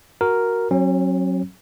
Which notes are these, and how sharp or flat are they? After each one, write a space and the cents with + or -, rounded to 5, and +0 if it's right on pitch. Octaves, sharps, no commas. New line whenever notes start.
F#4 +0 A#4 +0
F#3 +0 C#4 -45